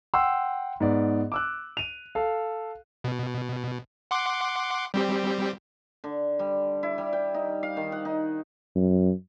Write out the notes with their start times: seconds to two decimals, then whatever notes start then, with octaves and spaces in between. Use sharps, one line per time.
0.14 F#5 G5 C6 E6
0.80 G#2 B3 D5
1.32 D6 E6 F#6
1.77 D#7 F7
2.15 A4 F5
3.04 B2
4.11 F#5 C6 D6
4.94 G3 C4 G4
6.04 D3
6.39 G3
6.83 E4
6.98 G3
7.13 G5
7.34 D#4
7.63 F5
7.77 D#3
7.92 F#5
8.05 D#4
8.76 F#2